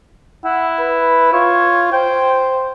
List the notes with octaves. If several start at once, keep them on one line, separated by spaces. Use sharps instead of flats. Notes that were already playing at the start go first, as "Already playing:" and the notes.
E4 F#5
B4
F4 C#5
C5 G5